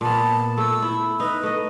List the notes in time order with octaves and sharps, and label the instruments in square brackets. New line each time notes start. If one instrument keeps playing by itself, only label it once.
[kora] A#2 B3 [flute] A5
[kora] A3 [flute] E6
[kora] E4
[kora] D#4 [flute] B4
[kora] A3 D#5